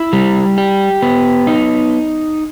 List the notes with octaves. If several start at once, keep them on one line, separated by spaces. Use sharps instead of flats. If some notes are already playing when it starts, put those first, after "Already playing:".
Already playing: E4
G3
G4
B3
D#4